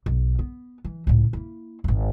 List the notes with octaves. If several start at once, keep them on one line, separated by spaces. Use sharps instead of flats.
B1
B3
E3
C#2 A2
A#3 E4
D#1 G#1